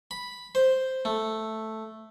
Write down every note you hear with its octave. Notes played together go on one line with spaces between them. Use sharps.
B5
C5
A3